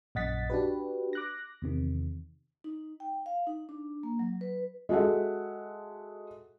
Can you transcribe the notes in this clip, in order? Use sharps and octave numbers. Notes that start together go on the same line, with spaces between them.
A#1 F#2 D#5 F#5 A6 B6
D4 F#4 G4 B4
D6 F#6 A#6
E2 C3 D#3
D#4
G5
F5
D#4
D4
A#3
F#3
B4
G#3 F#4 A4 E5 F#5